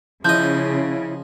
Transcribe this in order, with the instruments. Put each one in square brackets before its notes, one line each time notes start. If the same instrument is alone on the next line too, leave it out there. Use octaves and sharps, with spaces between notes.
[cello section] C#3 [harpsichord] F3 D#5 [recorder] E4 [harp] G6